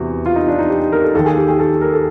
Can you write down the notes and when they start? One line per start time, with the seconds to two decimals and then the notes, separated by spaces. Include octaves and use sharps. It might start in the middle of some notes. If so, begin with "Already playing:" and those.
Already playing: E2 C3 E3 F#4 G4
0.26 F4
0.36 D#4
0.48 D4
0.59 D#4
0.70 G4
0.92 A#4
1.04 A4
1.15 D#2 D#3 A4
1.26 G#4
1.38 G4
1.48 G#4
1.60 A4
1.81 A#4
1.94 A4